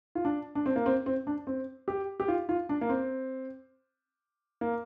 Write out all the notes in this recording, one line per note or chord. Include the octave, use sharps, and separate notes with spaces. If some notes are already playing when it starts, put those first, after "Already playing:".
F4
D4
D4
C4
A#3
C4
C4
D4
C4
G4
G4
F4
F4
D4
A#3
C4
A#3